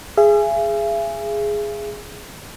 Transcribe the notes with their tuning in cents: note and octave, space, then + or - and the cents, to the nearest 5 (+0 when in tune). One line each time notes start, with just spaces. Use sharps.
G#4 +0 E5 +45